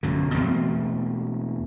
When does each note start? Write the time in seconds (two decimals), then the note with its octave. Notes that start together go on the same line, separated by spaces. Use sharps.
0.03 B1 F#2 D3
0.34 E2 B2 A3 C4